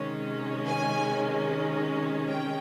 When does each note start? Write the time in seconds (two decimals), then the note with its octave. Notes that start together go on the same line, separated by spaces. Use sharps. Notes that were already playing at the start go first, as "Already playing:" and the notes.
Already playing: C3 D#3 G#3 C#4
0.66 G#5
2.29 G5